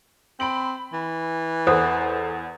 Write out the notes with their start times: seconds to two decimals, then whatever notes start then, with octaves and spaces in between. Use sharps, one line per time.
0.40 C4 B5 D7 F#7
0.93 E3
1.67 E2 A4 C5 F#5 D#6 F#6